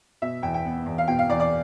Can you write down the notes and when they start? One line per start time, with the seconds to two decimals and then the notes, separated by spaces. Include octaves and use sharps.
0.22 B2 E5
0.42 E2 G5
0.54 G5
0.65 B3
0.86 E2
0.98 F5
1.08 B2 G5
1.19 F5
1.30 E2 D5
1.40 D5